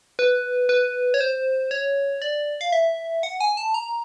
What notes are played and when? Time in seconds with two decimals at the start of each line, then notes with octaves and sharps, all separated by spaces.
0.19 B4
0.69 B4
1.14 C#5
1.21 C5
1.71 C#5
2.22 D5
2.61 F5
2.72 E5
3.23 F#5
3.40 G#5
3.57 A5
3.74 A#5